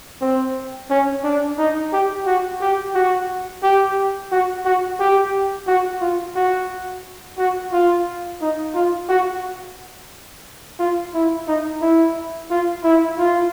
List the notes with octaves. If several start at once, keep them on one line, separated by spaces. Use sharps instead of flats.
C4
C#4
D4
D#4
G4
F#4
G4
F#4
G4
F#4
F#4
G4
F#4
F4
F#4
F#4
F4
D#4
F4
F#4
F4
E4
D#4
E4
F4
E4
F4